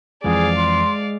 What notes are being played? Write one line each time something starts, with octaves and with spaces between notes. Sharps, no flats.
F2 E3 F3 G#3 G#4 D5 F5
C6